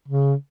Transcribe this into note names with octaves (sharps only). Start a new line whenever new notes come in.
C#3